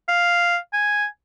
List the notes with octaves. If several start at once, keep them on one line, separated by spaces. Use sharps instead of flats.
F5
G#5